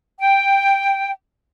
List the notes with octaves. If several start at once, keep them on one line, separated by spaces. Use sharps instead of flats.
G5